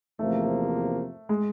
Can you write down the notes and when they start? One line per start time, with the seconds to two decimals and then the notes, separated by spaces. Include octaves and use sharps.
0.19 E2 C3 F3 A3 A#3
1.29 G#3